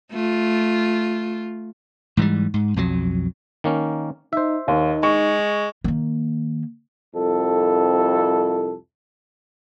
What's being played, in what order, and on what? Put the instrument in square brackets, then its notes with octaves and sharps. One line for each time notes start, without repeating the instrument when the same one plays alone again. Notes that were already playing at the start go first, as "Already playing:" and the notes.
[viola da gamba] A3 F4
[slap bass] G#2 E3 F#3 G3
G#2
B1 F2 F#3
[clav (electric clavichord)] D#3 A#3 C#4
[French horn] D#4 [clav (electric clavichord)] C5 E5
[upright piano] D#2 [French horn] D#4
[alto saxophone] G#3 [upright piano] C#6
[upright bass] D#3 A#3
[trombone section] C2 F2 A4